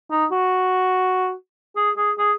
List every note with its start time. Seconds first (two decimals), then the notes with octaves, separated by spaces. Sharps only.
0.11 D#4
0.32 F#4
1.76 G#4
1.97 G#4
2.18 G#4